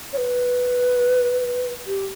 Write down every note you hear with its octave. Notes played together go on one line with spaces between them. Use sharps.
C#5
B4
G4